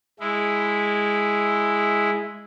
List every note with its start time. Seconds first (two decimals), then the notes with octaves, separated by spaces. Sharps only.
0.20 G#3 E4